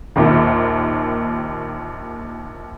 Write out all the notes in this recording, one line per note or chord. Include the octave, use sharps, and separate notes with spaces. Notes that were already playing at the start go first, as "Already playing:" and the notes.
A#1 D#2 D#3